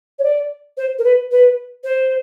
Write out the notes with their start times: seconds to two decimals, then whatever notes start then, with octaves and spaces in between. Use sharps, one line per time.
0.19 C#5
0.24 D5
0.77 C5
0.99 A#4
1.04 B4
1.31 B4
1.84 C5